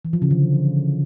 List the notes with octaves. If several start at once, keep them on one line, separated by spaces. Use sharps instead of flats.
E3
F3
C#3
D3